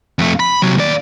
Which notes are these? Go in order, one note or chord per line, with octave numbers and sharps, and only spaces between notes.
F2 A3
B5
C3 F#3
D#2 D5